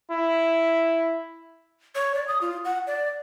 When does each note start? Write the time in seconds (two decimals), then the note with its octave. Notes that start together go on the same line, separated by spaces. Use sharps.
0.11 E4
1.95 C#5
2.15 D5
2.28 D#6
2.41 F4
2.65 F#5
2.87 D5